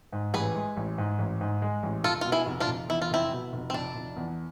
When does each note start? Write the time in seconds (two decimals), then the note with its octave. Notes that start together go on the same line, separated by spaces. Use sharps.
0.12 G#2
0.34 A1 G#4 B4
0.55 G#3
0.77 A1
0.98 G#2
1.19 A1
1.41 G#2
1.62 G#3
1.83 A1
2.04 F1 F4 A4
2.21 B2 F4
2.32 E4 G#4
2.46 F1
2.60 D4 F4
2.68 F1
2.89 E2 E4
3.02 F4
3.10 F1 C4 E4
3.32 B2
3.53 F1
3.70 C4
3.74 F1 D4
3.95 F1
4.16 E2